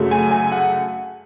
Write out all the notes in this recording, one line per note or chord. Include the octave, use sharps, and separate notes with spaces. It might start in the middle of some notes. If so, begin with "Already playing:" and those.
Already playing: F#2 C#3 F#3 A3
G#5
G#5
F#5